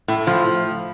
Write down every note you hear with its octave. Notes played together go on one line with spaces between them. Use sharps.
A2
F3